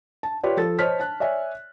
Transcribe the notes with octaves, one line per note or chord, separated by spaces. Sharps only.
A5
F4 G4 B4 C#5 D5
F3 A4 A6
C5 C#5 D#5 A5 F6 B6
A5 F#6
C#5 D5 E5 G#5